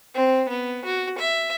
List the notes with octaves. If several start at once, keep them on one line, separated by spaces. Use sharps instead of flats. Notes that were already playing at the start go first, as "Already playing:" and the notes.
C4
B3
F#4
E5